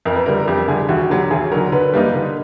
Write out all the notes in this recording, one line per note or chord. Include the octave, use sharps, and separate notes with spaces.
F2 A#4
B4
D3 G3 A#4
F2 G4
D3 G3 G#4
D#2 F#4
D3 F#3 G4
D#2 G#4
D3 F#3 A#4
D3 B4
G3 A#3 D#4
D3